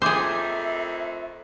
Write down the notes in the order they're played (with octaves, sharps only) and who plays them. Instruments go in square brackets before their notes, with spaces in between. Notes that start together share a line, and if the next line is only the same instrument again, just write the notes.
[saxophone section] F2 A2 D#3 [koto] G#4 C5 [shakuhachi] E5 [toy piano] D6 E6